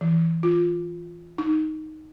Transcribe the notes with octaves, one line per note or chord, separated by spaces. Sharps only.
E3
F4
D#4